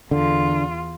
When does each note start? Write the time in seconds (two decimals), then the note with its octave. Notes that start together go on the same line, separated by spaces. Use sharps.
0.11 E2 D3 F4